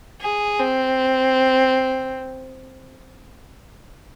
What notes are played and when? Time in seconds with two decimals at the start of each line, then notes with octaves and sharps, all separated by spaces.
0.21 G#4
0.59 C4